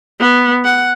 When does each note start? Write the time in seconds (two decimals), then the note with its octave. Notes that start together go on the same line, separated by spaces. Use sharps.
0.20 B3
0.64 F#5